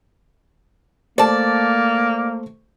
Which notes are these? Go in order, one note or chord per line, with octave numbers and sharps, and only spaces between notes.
A3 A#3 C5 D5 A5